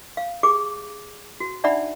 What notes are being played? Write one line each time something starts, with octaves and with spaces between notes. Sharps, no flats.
F5
G4 G#4 D6
F#4
D4 D#4 D5 E5 F#5 B5